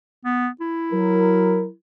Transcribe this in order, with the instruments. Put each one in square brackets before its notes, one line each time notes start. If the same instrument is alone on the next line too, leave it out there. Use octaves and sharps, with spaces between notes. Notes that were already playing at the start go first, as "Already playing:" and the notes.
[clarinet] B3
E4
[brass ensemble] F#3 A#4